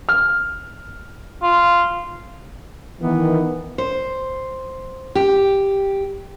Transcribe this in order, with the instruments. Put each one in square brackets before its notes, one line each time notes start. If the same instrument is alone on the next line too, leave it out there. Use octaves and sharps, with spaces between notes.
[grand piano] F6
[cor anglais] F4
[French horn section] D#3 E3 [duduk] B3
[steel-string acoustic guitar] C5
G4